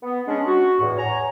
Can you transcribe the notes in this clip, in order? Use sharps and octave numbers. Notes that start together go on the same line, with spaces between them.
B3
G#3 C#4 D4
F#4
E2 A2
F#4 C#5 G#5 A#5